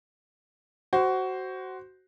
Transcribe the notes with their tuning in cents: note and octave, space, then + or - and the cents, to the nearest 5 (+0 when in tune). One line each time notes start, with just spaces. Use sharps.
F#4 +15 C5 +0